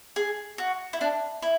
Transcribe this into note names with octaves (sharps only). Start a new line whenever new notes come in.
G#4
F#4
E4
D4
E4